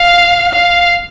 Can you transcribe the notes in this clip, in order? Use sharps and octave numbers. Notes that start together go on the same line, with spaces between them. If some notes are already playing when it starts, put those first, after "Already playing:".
Already playing: F5
F5